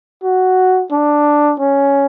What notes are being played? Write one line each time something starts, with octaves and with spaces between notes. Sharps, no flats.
F#4
D4
C#4